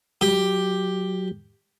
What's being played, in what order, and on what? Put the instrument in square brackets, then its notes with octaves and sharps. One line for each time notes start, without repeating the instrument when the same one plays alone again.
[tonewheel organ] F#3 [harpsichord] G4